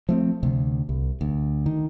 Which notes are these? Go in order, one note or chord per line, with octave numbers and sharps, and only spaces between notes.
F3 A3 C4
D2 C3
C2
D2
D#3